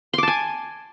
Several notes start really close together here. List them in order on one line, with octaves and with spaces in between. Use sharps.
C6 D6 A5 G#5